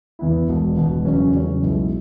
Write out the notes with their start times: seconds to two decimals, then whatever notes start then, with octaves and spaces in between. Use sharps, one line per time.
0.19 E2 E3 B3 E4
0.48 E1 E2 B2
0.77 E1 E2 B2
1.05 E2 C#3 F#3 C#4
1.34 E2 C#3 F#3 C#4
1.63 B1 B2 G#3 E4